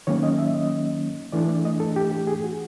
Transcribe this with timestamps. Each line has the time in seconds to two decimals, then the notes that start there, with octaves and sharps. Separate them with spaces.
0.07 D#3 F#3 A#3 C#4 C#5
0.23 D#5
0.38 E5
0.54 D#5
1.32 E3 A3 D4 D5
1.49 D5
1.65 D#5
1.80 A4
1.96 G4
2.12 G4
2.27 G#4
2.44 F#4